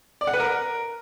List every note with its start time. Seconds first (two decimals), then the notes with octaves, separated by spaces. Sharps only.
0.21 D5
0.27 F#5
0.34 B4
0.40 A#4